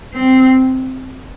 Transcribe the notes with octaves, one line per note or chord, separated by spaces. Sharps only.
C4